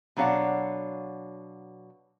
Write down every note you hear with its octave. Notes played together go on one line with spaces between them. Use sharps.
B2 F#3 D4 C#5 F5 F#5